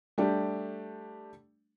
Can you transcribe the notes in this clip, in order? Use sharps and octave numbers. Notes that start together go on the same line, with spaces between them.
G3 A3 D4 G4